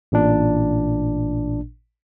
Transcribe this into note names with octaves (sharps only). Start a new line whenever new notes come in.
A1 A#2 D4